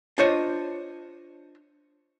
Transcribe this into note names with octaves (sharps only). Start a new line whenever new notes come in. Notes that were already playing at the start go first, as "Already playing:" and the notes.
D4 F4 C5 C#5 D#5